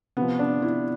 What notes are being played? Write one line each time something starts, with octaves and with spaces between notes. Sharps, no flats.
C3 F3 B3
D4
E4